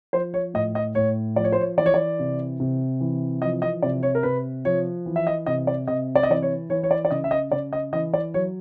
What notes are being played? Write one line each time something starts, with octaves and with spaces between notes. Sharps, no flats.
F3 C5
C#5
A2 D#5
D#5
A2 C#5
F3 D5
C#5
C5
C#5
E3 D5
C#5
D5
C3
C3
E3
F3 D#5
D#5
C3 D5
C#5
A#4
C3 B4
F3 C#5
E3
E5
D#5
C3 D#5
D5
C3 D#5
D5
D#5
E3 D5
C#5
E3 C#5
C#5
D5
D5
C#3 D#5
E5
D#5
C#3 D5
D#5
E3 D#5
D5
F#3 C#5